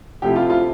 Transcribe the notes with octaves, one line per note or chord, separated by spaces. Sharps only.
C3 F3 A3 E4 G4
F4
F4